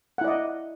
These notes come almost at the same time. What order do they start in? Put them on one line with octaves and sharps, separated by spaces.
F#5 E4 D5 D#5